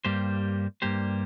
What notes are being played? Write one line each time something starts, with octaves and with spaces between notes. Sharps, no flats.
G2 G3 A#3 G4 C5
G2 G3 A#3 G4 C5